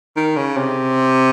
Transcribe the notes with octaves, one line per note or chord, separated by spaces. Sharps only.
D#3
C#3
C3